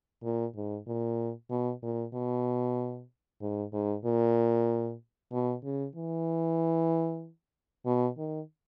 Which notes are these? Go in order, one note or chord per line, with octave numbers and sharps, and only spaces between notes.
A#2
G#2
A#2
B2
A#2
B2
G#2
G#2
A#2
B2
C#3
E3
B2
D#3